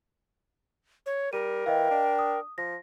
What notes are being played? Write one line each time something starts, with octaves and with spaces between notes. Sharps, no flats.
C#5
G3 A#4 D#7
E3 D#5 F5 G5
D4
D#6
F3 A#6